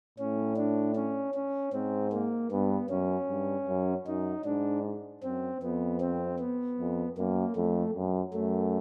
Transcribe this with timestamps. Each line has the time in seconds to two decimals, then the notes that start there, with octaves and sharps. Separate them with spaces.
0.18 A2 C#4
0.57 D4
0.95 C#4
1.34 C#4
1.73 G#2 C4
2.12 A#3
2.51 G2 B3
2.89 F#2 C#4
3.29 G2
3.68 F#2
4.07 F#2 D#4
4.45 G#2 D4
5.23 F#2 C4
5.62 F2 B3
6.01 C4
6.39 B3
6.79 F2
7.17 F#2 A#3
7.56 F2 A3
7.95 F#2
8.33 F#2 A3